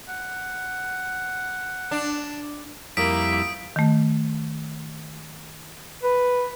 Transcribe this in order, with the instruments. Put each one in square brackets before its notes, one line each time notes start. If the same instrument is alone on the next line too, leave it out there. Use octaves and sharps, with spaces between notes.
[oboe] F#5
[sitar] D4
[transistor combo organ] F2 G3 E4 [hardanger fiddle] A#3 [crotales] D#6 B6 D7
[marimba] D#3 A3
[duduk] B4